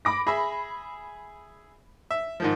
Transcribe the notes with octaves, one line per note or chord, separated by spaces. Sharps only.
B5 D6 A#6
G#4 E5 B5
E5
G#2 D#3 F3